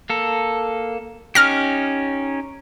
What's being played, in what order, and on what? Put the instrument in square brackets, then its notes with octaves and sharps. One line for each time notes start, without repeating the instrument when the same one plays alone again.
[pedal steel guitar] A#3 A4
[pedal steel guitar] C#4 D#4 G4 [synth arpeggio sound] F6 A#6